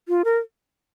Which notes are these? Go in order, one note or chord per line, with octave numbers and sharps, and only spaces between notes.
F4
A#4